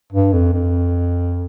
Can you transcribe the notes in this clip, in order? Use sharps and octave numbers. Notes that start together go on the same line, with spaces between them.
G2
F2
F2